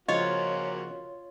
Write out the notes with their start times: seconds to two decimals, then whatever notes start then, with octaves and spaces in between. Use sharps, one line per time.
0.08 C#3 F3 A#3 C#4 F4 F#4 C#5 D#5